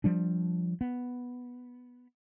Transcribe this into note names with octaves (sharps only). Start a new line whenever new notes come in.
F3 G3 D4
B3